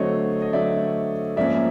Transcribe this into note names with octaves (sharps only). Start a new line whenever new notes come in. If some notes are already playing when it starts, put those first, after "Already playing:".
Already playing: D3 F#3 A3 C4 C#5 D#5
D#5
D3 F#3 A3 C4 D5 E5
G#2 F3 A#3 C#4 D5 E5